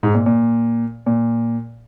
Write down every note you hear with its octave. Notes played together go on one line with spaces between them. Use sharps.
G#2
A#2
A#2
A#2